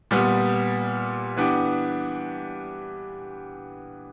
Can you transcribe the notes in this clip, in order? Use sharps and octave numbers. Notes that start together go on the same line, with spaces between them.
A#2 G3 B3
E3 B3 D4 G4